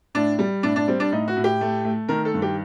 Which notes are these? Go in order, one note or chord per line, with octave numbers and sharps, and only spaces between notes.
A2 D4
G3
A2 D4
D4
G3 C4
D4
A2 D#4
F#4
A2
G4
A3
A3
D#3 A#4
A4
G2
G4